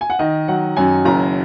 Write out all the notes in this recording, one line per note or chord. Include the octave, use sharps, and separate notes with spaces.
G#5
F#5
D#3 D#5
F#3 F#5
F#2 G#5
F#1 A#5